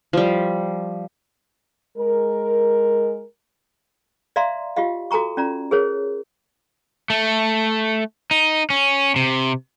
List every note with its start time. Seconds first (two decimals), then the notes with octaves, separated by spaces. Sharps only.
0.13 F3 G3
1.97 G#3 A#4
4.36 D5 E5 F5 A#5 C6
4.76 F4 G4 D#5 F5
5.11 F#4 A4 G#5 A#5 C#6
5.37 C#4 F4 D5 A#5
5.71 G#4 A#4 C5 C#5
7.10 A3
8.31 D#4
8.70 C#4
9.16 C3